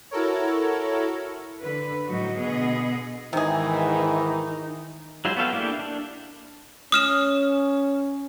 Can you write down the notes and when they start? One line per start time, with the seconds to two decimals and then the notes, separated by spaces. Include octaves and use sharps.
0.11 E4 F#4 A4 A#4 C#5
1.60 D3 B4
2.08 A2 F3 F#3 D#4 F#4
2.39 B2 D3 B3 G#4 D#5
3.33 G#2 C3 D#3 E3 D#4 G#4
5.25 F#3 G#3 E4 F4 C5
5.37 B3 F#4 A4 F5 G5
5.53 A#3 D4 E4 G4 A4
5.79 D4
6.92 C#4 D#6 F6 E7